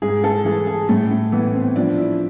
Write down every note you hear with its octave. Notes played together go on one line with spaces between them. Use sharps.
G#2 G#4
A4
E3 G#4
G#4
A2 A3
A3
E3 B3
C4
F3 D4
E4